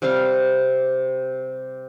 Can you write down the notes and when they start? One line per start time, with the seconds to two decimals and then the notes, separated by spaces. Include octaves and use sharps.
0.02 C3 G3 G4 F5